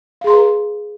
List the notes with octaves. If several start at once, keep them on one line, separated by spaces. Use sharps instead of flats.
G#4 B4 F5 A#5 C6